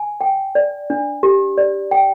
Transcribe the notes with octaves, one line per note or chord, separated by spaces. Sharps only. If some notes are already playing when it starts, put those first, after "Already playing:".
Already playing: G#5
G5
D5
D4
G4
D5
G5